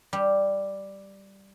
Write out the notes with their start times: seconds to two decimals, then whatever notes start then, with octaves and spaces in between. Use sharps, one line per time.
0.13 G3